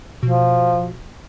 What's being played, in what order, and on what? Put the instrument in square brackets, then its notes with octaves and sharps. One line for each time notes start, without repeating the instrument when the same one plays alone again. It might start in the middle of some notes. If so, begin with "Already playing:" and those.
[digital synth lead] B2 [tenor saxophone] F3